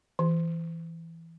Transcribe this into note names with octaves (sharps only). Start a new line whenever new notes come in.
E3